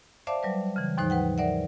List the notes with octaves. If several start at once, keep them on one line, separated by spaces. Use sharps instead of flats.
C5 D5 E5 F5 A5 D6
F#3 G3 B4
C#3 E3
D#2 G#2 F3 D#4 C5 F#6
B4 F#5 G5
A#4 C5 D5 E5 F#5